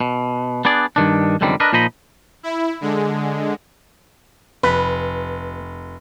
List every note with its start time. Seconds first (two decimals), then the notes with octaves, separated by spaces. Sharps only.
0.01 B2
0.65 B3 D4 G#4 D5
0.96 G2 D#3 D4
1.41 C#2 F#2 D3 D#3 G3 C4
1.60 D4 A#4 B4 D#5
1.73 A#2 F3 D#4 D#5 B5
2.43 E4
2.81 D3 G#3
4.63 F1 B4